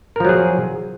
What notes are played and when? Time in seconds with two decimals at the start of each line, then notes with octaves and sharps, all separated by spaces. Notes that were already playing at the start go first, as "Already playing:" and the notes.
0.16 A#4
0.20 F3
0.25 F#3
0.29 G#4